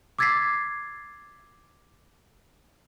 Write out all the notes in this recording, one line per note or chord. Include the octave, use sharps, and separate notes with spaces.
D6 E6 G#6 A6 B6 C7